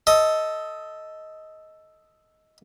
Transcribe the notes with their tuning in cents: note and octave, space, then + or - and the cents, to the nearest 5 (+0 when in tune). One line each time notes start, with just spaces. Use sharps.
A4 +0 D#5 +15